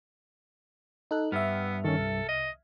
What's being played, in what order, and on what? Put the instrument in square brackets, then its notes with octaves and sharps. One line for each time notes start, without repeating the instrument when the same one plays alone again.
[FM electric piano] D#4 A4 F#6
[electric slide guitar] G2 [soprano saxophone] B3 [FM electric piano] E5 F6
[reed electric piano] D#3 C#4 [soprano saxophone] A4
[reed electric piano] C2
[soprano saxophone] D#5